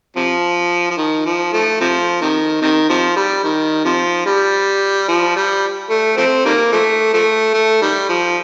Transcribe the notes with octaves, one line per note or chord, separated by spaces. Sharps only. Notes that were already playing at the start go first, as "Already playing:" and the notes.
C3 F3
F3
D#3
F3
F3 A3
C3 F3
C3 D#3
C3 D#3
C3 F3
G3
D#3
C3 F3
G3
F3
G3
A3
F3 A3 C4
D#3 G3 A#3
F3 A3
F3 A3
A3
D#3 G3
F3